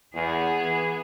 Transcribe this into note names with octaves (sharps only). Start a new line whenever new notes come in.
E2 B3 E4 G#4
E3